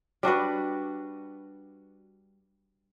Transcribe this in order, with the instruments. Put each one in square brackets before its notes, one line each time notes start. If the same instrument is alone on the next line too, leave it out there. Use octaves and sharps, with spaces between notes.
[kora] G3 D4 F#4 B4